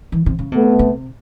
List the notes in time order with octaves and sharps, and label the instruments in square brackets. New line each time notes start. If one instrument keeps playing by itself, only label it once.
[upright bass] E3
C3
C#3
[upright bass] C3 [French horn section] A3 B3
[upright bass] C3